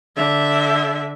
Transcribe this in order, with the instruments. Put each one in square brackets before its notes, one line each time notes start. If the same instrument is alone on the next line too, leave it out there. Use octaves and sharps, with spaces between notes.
[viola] D3 E5